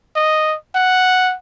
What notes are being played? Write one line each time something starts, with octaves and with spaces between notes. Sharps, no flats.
D#5
F#5